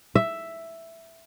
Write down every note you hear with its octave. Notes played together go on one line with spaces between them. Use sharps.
E5